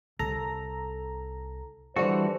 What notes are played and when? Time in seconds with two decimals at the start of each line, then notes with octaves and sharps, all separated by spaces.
0.19 C2 A4 A#5
1.96 E3 G3 D4 F#4 A4 C5